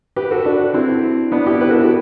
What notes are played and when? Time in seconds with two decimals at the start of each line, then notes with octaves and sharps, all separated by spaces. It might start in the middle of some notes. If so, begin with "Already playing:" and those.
0.16 G4 B4
0.31 F#4 A4
0.45 D4 F#4
0.74 C4 E4
1.32 B3 D4
1.46 E4 G4
1.61 G4 B4
1.70 F#4 A4
1.80 E4 G4